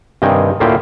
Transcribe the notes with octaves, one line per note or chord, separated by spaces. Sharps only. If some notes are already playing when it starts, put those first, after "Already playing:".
G2 C3 D#3 D#5 G5 G#5
D2 A2 A#3 F4 E5 G5